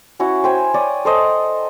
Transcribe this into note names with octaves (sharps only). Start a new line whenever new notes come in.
C#4 E4 F#4 C#5
C5 G5 G#5
C#5 D5 D#6
A4 C5 D#5